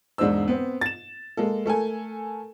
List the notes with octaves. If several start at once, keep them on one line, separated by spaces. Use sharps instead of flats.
E1 G#2 G#3 D4 C5 E6
B3 C4
A6 E7
G#3 A#3 A4
A3 A4 A#4 G#5